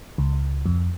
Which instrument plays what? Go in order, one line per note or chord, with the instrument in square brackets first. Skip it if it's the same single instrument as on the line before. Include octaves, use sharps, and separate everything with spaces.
[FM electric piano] C#2
F2